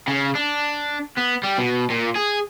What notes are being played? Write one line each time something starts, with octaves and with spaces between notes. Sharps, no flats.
C#3
D4
B3
G3
B2
A#2
G#4